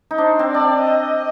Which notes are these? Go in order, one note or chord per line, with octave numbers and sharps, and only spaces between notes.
D#4
D4 C5
C4
D4 D5
C4
D#5